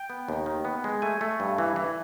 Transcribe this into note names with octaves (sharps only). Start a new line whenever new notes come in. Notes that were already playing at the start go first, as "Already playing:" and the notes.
Already playing: G5
B3
D#2
D#3
B3
G#3
A3 G#5
A3
G2
E3
E3